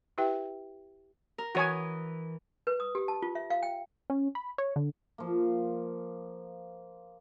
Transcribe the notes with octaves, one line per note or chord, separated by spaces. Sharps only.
E4 G4 B4 E5 G5
A#4
E3 F#4 C#5 G#5 D#6
B4
D#6
G4
A5
F4
E5
F5
G5
C#4
B5
C#5
D3
F3 A#3